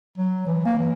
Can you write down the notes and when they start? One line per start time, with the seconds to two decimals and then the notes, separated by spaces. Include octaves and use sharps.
0.18 F#3
0.47 E3
0.65 A#3
0.78 E3